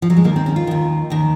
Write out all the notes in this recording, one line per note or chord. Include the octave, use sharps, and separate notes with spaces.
F3
F#3
G#3
D#2 D#3 A#3
C4
C#4
F4
D#2 D#3
D#2 D#3